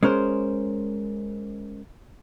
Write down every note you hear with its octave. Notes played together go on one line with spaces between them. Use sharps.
G#3 C#4 A#4 C5